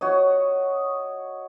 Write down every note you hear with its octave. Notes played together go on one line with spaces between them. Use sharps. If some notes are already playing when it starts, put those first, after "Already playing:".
F#4 C#5 D#5